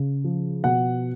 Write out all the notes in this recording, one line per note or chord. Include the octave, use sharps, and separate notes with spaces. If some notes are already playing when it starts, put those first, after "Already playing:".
Already playing: C#3
F3
B2 F#5